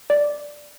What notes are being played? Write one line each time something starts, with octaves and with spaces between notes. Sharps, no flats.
D5